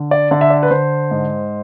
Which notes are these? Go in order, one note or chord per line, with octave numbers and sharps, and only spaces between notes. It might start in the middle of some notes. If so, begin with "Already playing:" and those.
Already playing: D3
D5
D3 D5
E5
D5
B4
D3 C5
G#2